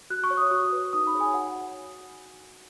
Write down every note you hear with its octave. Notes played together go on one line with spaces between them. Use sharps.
F#4 F#6
C#6
C#5
D#6
F#4
B4
D#4 D#6
B5
G#4 C#5
G#5
F#4 F#5
C#5